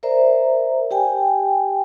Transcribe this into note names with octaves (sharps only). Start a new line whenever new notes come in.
A#4 C5 D5 E5 A#5
G4 G5 G#5